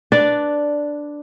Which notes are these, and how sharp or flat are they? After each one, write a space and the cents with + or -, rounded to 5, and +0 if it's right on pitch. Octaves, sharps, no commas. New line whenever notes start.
D4 +0 B4 +0 D5 -5